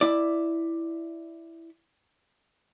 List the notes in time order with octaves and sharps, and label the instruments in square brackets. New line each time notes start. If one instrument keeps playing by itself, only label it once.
[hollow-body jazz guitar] E4 D5